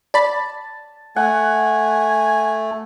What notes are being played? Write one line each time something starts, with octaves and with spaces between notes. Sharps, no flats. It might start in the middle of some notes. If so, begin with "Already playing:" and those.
D5 A5 B5
A3 F#5 G#5